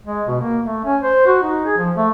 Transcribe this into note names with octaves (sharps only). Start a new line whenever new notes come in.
G#3
B2
A#3
A3
C#4
C5
F#4
D#4
G#4
F3
A3